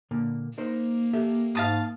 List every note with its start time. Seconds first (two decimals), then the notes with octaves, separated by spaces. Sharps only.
0.11 A#2 D3 A#3
0.58 A#3 D#4 A#4 C5
1.13 G4 A4 E5
1.55 G#2 F5 A5 D#6